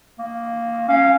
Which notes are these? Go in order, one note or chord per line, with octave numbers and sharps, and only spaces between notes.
A#3
C#4 F5